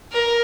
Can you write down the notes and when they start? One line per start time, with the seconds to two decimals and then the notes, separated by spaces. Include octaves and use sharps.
0.12 A#4